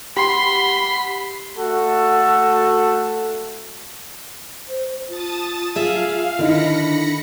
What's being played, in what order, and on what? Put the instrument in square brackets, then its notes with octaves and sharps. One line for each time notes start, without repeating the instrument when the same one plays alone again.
[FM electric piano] G4 F#5 [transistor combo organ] B5 [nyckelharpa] C6
[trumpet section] A3 F#4 A4
[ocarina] C5
[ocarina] F4 [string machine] A5 D#6 A6
[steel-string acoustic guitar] G#4 E5 [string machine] F5
[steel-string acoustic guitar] D3 [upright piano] D#3 E4 D#5 [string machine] B5 A#6 C#7
[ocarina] D4